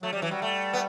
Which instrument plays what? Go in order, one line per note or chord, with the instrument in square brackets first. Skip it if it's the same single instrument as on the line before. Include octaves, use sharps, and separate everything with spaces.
[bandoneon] F#3 [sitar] A3
[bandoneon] F#3 [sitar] G3
[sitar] E3
[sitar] F#3 [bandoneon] G3
[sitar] A3
B3